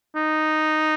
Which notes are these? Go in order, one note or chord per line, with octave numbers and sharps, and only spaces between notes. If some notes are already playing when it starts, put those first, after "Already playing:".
D#4